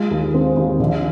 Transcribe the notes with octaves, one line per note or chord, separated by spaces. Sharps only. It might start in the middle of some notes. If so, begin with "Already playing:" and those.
Already playing: G#3 F4
D#2
C4
D#2
A#1